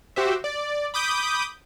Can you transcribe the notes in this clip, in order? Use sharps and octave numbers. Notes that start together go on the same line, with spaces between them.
F#4 G4 C5 E5
D5
B5 D6 D#6 G6